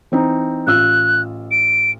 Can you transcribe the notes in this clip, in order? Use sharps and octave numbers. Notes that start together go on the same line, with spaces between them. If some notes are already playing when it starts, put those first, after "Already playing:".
E3 C4 D#4
A1 F4 E6 F#6
D7